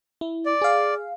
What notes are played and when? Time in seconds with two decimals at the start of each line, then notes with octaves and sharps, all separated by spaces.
0.21 E4
0.45 D5
0.62 G#4 F5